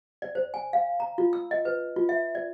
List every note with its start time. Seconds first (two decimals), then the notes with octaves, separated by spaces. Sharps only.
0.22 D5
0.35 C5
0.54 G#5
0.73 F5
1.00 A#5
1.18 F4
1.33 E6
1.51 D#5
1.65 B4
1.96 F4
2.09 E5
2.35 D5